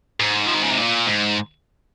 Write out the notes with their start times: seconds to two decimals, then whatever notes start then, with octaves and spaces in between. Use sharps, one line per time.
0.20 G#2
0.47 F3
0.54 D#3
0.63 C#3
0.70 C3
0.78 A#2
1.07 G#2